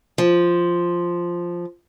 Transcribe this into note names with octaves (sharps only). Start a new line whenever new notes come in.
F3